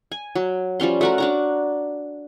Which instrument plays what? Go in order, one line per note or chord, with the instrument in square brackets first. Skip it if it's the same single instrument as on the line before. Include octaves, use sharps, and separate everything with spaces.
[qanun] G#5
F#3
F3 G3 C#4 C6
A3 F#4 A#4
D4 F#4 A#5